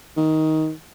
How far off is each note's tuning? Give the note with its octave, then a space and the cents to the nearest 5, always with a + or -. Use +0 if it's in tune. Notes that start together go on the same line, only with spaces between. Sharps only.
D#3 +15